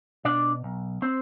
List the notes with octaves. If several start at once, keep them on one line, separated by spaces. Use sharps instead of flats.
B2 D4 D5
B1
C4 C5